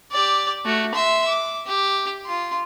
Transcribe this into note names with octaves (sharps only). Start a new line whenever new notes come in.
G4 D5
A3 F#4
E5 C6
D6
G4
F4 C6